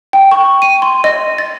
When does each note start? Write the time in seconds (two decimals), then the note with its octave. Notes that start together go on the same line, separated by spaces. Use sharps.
0.13 G5
0.31 C#6
0.62 D#7
0.82 C6
1.04 D#5
1.38 A6